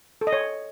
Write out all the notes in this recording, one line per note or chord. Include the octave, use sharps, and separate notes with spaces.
A4
D#5
C#5